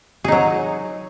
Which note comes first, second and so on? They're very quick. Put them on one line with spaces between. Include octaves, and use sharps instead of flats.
G#4 D#4 F#3